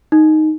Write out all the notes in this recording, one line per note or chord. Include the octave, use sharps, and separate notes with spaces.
D#4